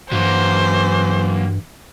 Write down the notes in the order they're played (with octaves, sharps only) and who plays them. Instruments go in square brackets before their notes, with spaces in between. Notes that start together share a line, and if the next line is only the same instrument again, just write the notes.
[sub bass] G2 [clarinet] E3 [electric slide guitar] F#3 A#3 [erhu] C5